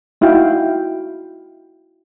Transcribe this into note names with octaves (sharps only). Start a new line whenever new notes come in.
D#4 E4 F#4 F5 G5